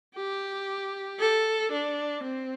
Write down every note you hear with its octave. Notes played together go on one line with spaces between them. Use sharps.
G4
A4
D4
C4